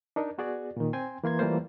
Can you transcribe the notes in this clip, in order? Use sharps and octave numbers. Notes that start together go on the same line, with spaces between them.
D4 D#4 A#4
B3 F#4 G#4 D5
A#2 D#3
C4 G5 G#5 C6
E3 A#3 C6 G#6
E3 G3 A3 A#3 F4 C5